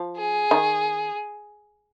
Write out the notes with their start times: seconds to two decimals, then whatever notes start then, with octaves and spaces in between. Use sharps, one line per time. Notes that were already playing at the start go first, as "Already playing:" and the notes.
Already playing: F3
0.17 G#4
0.51 D#3